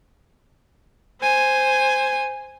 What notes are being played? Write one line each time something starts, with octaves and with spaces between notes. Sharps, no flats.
C5 G#5